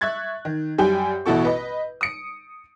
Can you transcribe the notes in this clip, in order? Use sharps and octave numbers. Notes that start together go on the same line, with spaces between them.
E5 C#6 F#6 G#6 A6
D#3
F#2 G3 G5 G#5 G6
A1 B2 E4 F#4 A4 C#6
B4 D#5
D#6 C#7 D7